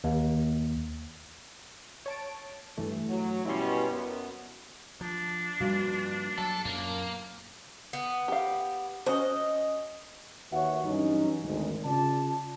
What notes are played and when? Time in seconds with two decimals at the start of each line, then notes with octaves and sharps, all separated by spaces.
0.04 D#2
2.06 C#5 A5 D7
2.77 G2 E3 A3
3.09 F#3
3.45 B2 G3 C#4 E4 C6
3.89 F#2 B3
5.01 F3 D4
5.60 G2 A#2 F3 G3 F#4
6.38 F#3 A4
6.65 F#2 A#2 A#3
7.93 B3
8.28 G4 F5
9.06 C#4 F#4 C5 D#5
10.52 D#2 F#4 B4 C#5 E5 F#5
10.85 G2 E3 F#3 C#4 D#4
11.44 G#1 D2 G#3
11.84 C#3 F4 D5 A5